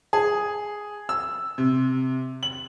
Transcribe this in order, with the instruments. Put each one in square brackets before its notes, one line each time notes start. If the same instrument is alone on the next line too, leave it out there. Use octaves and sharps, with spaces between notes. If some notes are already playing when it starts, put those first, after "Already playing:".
[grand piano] G#4
E6
C3
F#7